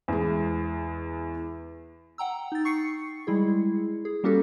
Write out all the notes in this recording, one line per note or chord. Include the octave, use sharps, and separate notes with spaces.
E2 G#3
F#5 G5 A#5 E6
D#4 A6
C#6 C7 C#7
G3 G#3 E4 G#4
G#4
G3 A#3 C#4 F#4 G4 A4